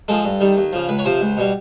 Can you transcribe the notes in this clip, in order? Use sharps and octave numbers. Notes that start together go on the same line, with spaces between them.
F3 G#3 A4
G2
D#3 G3
D#2
C#3 F3
C#2 B4
C#5
C3 F3 C5
C#2
B2 G3